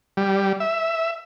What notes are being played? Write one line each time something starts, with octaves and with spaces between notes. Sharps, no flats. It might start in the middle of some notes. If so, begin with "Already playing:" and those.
G3
E5